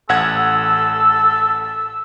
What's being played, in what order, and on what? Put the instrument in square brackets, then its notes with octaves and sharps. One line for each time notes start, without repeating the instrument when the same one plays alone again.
[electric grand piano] A1 F#5 G#6 [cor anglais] A4 [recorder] E6